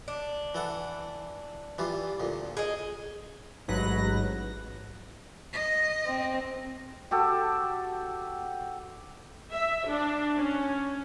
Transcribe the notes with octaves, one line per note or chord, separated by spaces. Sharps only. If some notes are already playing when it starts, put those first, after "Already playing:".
D4
E3 A4 F#5
E3 G3 F4
D2 A#2
G#4 D#5
A1 G#2 F#3 B4 F#6 A#6
D#5
C4
F#4 G4 A4
E5
D4
C#4